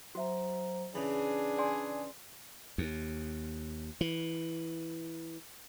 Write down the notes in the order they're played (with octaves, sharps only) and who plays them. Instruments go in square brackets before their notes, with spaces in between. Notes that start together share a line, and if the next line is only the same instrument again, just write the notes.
[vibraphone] F#3 C5 A#5 [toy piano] F#4 E5
[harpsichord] C#3 E3 [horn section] D4 G#4 [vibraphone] B5
[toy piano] D5 G#5 C6
[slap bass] D#2
E3